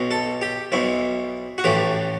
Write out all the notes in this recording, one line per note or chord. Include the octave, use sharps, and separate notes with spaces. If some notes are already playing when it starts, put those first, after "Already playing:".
Already playing: B1 B2
A4
G4
B1 B2 E4
F#4
A1 A2 E3 G4